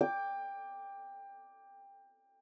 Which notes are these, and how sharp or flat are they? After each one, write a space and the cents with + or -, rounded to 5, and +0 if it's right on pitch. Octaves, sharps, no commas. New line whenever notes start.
G5 +20 D6 +0